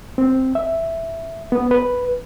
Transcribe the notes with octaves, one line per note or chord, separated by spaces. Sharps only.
C4
E5
B3
B4